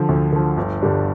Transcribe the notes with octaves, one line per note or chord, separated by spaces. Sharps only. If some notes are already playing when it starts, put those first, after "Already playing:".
Already playing: D3 F3
D2
D3 F3
G1
G2 D3 G3 D4